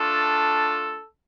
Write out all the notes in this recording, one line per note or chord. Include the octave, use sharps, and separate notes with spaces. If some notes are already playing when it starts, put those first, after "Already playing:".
Already playing: A3 D4 F4 A4